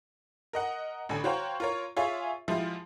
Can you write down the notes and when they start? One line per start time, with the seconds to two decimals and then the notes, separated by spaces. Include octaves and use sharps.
0.53 A#4 D#5 F#5
1.09 A1 D3 G#5
1.24 F#4 C5 C#5 F5 G5 A#5
1.60 F4 A#4 C#5
1.96 F4 G#4 C#5 E5 F5
2.48 F3 G#3 E4 F4 G4